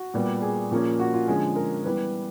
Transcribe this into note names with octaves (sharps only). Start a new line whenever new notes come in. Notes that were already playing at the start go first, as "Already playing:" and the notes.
Already playing: F#4
A#2 G3 B3
G#4
A#2 F3 A#3 C#4
F#4
F4
D3 F3 G#3 C#4 G#4
A#4
E3 G3 B3 B4